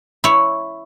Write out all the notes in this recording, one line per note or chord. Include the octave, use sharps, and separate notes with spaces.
E4 C#5